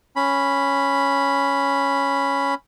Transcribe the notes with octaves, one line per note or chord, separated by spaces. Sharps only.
C#4 B5